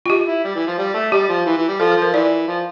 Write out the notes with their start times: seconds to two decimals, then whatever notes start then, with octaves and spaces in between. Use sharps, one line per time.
0.06 F4
0.10 G4
0.27 E4
0.44 G3
0.55 E3
0.67 F3
0.78 G3
0.94 A3
1.12 G3 G4
1.29 F3
1.46 E3
1.57 E3
1.69 G3
1.80 F3 A4
1.92 A4
1.97 F3
2.02 A#4
2.14 E3 D5
2.47 F3